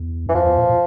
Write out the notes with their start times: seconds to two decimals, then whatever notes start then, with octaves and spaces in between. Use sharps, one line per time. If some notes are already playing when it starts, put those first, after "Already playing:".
Already playing: E2
0.26 F#2 E3
0.35 F2 F3
0.46 E2
0.57 A#2
0.69 A#2